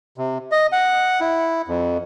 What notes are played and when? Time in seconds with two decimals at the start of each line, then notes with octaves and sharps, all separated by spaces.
0.18 C3
0.52 D#5
0.72 F#5
1.20 E4
1.68 F2